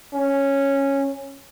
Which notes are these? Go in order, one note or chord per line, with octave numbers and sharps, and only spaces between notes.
C#4